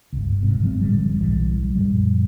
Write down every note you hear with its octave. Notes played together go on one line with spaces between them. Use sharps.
G1 C#2
G1 G#2 C3
G1 F3 G#3 C4
F#1 A2 D3 G3
D1 B1 E3 G3
F#2 A#2 F3 G3